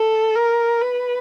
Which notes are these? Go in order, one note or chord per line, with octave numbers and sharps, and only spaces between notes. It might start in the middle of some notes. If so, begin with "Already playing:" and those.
Already playing: A4
A#4
B4